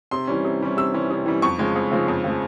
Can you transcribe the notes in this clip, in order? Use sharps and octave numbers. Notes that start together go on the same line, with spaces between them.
C3 C6
E3 G3 C#4
C3
E3 G3 C#4
C3 E6
E3 G3 C#4
C3
E3 G3 C#4
F2 C#6
C#3 F3 G#3
F2
C#3 F3 G#3
F2
C#3 F3 G#3